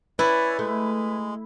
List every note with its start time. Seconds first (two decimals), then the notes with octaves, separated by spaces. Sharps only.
0.19 E4 B4 C#5 D5 G#5
0.59 G#3 A3